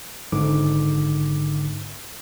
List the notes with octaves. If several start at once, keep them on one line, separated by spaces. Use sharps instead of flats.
G#1 G#2 D3 D6